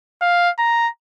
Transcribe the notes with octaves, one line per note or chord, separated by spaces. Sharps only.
F5
A#5